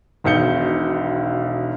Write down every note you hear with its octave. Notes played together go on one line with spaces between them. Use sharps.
E1 B1 D#3 G6 C#7 G7